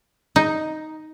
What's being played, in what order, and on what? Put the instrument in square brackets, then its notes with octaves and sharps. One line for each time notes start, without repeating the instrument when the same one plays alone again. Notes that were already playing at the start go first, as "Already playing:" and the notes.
[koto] D#4